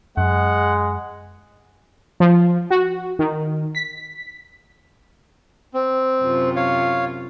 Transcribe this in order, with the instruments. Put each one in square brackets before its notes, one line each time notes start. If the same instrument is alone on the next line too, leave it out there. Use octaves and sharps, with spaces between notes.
[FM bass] F#2 [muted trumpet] G#3 [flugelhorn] F#5
[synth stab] F3
F#4
D#3
B6
[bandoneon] C4
[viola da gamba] F#2 C3 F4
[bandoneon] C#5 F5